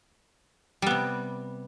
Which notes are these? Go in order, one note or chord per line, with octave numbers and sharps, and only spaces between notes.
C3 G3 B3